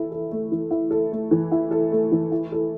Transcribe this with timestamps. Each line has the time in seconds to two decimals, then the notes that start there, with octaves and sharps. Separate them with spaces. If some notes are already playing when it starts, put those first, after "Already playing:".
Already playing: E3 E4 A4
0.12 A4
0.31 A3
0.52 E3
0.71 E4
0.91 A4
1.12 A3
1.31 E3
1.51 E4
1.71 A4
1.92 A3
2.12 E3
2.31 E4
2.52 A4